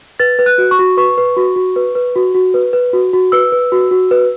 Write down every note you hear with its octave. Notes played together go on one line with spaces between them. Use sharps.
B4 A6
B4
F#6
F#4
C#6
F#4
B4 C#6
B4
F#4
F#4
B4
B4
F#4
F#4
B4
B4
F#4
F#4
B4 E6
B4
F#4
F#4
B4